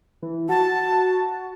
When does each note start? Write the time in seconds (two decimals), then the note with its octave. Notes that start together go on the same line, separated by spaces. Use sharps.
0.22 E3
0.49 F#4 A5